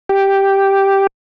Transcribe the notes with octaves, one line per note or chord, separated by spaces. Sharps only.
G4